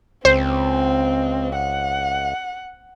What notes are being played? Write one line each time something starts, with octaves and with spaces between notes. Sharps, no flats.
C#2 C4 C5
F#5